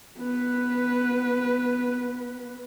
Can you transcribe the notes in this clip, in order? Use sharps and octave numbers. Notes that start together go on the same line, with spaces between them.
B3 B4